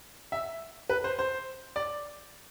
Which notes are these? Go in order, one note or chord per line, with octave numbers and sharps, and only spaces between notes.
E5
B4
C5
C5
D5